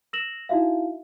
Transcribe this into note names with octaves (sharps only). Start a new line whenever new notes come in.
E6 A#6 E7 F#7
D#4 E4 F#4 E5 F5